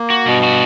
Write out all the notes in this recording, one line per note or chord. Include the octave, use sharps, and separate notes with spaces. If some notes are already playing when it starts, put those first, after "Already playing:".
Already playing: A#3
F#4
G2 B2
F#4